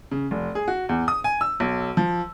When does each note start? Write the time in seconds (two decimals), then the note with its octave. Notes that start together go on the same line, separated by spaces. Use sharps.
0.11 C#3
0.31 F1
0.55 G#4
0.68 F#4
0.89 E2
1.08 D#6
1.24 G#5
1.41 E6
1.60 B1
1.97 F3